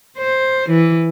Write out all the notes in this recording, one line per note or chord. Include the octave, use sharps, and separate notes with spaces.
C5
E3